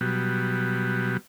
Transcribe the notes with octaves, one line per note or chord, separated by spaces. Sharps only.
B2 F#3 G3